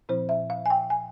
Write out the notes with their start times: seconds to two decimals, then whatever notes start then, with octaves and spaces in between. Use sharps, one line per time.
0.09 A#2 F3 C4 E4 C5
0.29 E5
0.50 F5
0.66 G#5
0.70 G5
0.90 G#5